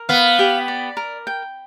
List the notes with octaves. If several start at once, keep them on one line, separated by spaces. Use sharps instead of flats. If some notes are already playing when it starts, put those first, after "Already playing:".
Already playing: A#4
B3 F5
G4
D5
A#4
G5